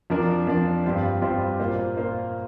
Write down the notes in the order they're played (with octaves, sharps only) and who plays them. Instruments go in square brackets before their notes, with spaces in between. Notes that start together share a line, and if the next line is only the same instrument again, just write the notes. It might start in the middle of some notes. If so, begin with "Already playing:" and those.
[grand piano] F2 F3 D4 A#4 D5
F2 F3 D4 A#4 D5
G2 G3 C4 F4 C5
G2 G3 C4 F4 C5
A#2 A#3 F4 C5
A#2 A#3 F4 C5